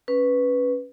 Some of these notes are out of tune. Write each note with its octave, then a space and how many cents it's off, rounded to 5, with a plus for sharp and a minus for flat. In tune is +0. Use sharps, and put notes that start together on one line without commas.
C#4 +0 B4 +0